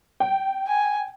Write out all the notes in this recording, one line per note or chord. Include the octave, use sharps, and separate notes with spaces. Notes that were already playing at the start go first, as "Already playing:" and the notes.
G5
G#5